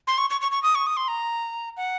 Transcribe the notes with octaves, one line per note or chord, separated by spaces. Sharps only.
C6
C#6
C#6
C#6
C#6
D#6
C#6
D#6
C6
A#5
F#5